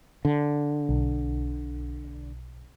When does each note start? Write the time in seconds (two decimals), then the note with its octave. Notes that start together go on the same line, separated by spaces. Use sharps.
0.25 D3
0.89 B1